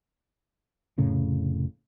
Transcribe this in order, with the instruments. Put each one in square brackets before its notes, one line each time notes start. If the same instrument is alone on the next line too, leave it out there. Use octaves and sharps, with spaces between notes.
[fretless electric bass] F1 A2 C#3